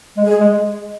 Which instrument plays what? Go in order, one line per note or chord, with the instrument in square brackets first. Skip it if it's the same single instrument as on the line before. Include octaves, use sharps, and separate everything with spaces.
[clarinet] G#3
[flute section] G#4
[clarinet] G#3